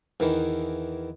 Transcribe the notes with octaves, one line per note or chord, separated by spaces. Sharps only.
E2 D#3 E3